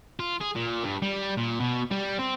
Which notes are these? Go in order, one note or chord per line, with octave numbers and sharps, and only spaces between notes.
F4
G#4
A#2
G2
G3
A#2
B2
G3
C4